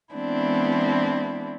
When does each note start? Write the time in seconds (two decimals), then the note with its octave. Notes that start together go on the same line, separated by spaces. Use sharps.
0.14 E3 G#3 B3 C4 D4 E4